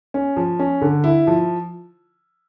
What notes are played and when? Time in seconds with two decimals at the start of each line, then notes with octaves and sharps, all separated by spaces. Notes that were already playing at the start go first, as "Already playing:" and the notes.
0.14 C#4
0.36 F3
0.59 C#4
0.81 D3
1.04 E4
1.27 F3